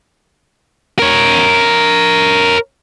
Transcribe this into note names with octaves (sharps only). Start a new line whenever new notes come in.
A#4 C#5